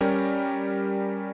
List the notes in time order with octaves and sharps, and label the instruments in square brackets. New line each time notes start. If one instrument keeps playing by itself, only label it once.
[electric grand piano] G3 C#4 G4 A#4